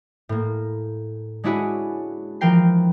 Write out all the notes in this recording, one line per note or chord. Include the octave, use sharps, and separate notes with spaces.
A2 A#3
G#3 C#4 D4 E4 F#4 G#4
E3 F3 A#4 G5 C7